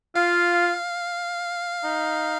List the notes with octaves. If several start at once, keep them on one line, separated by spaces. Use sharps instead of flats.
F4 F5
D#4